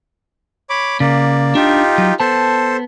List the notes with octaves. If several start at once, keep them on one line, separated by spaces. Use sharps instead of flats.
C#5 B5 D6
C#3 A#3 D5
D4 D#4 F4 G4
F#3
B3 A4 C5 A5